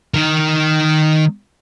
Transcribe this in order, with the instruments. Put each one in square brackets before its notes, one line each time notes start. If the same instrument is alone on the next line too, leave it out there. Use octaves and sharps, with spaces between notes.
[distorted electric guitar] D#3 A#4